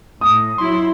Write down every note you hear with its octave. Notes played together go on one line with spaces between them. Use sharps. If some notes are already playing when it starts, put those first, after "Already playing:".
A2 D#6
F#3 E4 C6